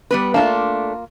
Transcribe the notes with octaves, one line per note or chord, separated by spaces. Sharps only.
G3 B3 B4
A3 A#3 D4 F4